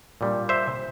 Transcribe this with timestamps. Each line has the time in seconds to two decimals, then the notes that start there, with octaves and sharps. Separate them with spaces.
0.21 A#2 G3 D4
0.49 C5 E5